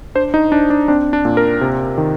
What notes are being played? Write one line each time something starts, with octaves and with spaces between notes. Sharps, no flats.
D4 C5
D#4
D4
D4
C4 D4
D4
A#2
A#4
C3
D#3